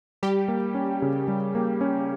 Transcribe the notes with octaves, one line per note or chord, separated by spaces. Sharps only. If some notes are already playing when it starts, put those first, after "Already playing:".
G3 G4
A#3
C#4
C#3
G3
A#3
C#4